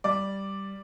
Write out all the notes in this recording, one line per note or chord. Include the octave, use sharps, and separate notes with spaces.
G3 D5